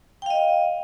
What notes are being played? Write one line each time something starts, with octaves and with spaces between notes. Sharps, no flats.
D#5 F5 G5